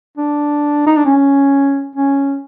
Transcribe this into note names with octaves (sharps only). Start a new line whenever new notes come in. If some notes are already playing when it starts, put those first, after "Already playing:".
D4
D#4
D4
C#4
C#4